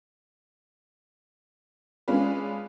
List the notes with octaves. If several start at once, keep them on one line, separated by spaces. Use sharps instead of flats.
G#3 C#4 D4 F4 B4